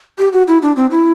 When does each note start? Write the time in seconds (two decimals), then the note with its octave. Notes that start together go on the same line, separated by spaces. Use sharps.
0.19 G4
0.33 F#4
0.48 E4
0.62 D4
0.76 C4
0.91 E4